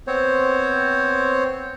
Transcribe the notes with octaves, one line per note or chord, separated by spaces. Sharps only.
B3 C4 C5 C#5